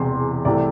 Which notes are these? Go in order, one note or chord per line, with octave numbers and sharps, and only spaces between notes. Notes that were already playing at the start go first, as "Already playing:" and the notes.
Already playing: E1 E2 C3 C6
C2 C3 E3 A3 D5